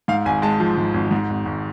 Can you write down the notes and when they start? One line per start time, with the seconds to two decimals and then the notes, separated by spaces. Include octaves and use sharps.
0.08 G#2 F5
0.25 G#1 G#5
0.42 G#3 A5
0.60 F3
0.77 G#2
0.94 G#1
1.11 G#2
1.30 G#1
1.46 G#1